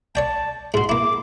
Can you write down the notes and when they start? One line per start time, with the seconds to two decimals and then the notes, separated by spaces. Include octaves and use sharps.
0.15 C#5 D5 G5 A5
0.74 G#2 F#4 C6
0.89 A#3 E4 D6